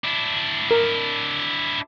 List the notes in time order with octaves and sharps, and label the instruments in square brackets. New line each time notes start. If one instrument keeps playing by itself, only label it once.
[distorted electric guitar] D4 E4
[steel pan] A#4